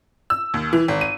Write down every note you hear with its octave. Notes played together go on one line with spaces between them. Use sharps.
E6
D#2
E3
G#1
D#7